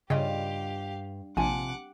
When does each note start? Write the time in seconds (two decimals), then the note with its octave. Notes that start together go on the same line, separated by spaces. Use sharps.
0.10 G2 C#3 F4 G4 D#5 F5 G5
1.37 A#1 C3 F4 F#5 G#5 A5 D6